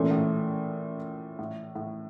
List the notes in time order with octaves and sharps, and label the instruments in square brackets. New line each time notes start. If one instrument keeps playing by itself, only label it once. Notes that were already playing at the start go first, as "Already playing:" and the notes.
Already playing: [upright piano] A#2 [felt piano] E3 A3 C#4 E4
[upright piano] A2
A2
A2